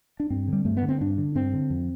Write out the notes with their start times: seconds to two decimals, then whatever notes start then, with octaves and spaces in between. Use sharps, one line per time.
0.20 D4
0.30 G2 C4
0.48 D3 G3
0.65 G2 A3
0.77 B3
0.82 D3
0.89 C4
1.01 G2 D4
1.18 D3
1.35 G2 C4
1.54 D3
1.70 F2